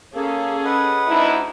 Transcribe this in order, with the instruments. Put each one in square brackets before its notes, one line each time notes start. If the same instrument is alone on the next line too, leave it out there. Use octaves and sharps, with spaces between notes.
[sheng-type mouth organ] A#3 [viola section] C#4 G#4 A4
[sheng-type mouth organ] B4 D#5 F#5
[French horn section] D2 D#4 E4